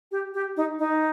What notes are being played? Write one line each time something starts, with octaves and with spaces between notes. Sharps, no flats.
G4
G4
D#4
D#4